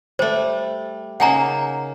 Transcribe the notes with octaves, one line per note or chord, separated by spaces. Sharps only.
G3 A3 C5
C#3 A#3 D#4 F#5 G#5 A#5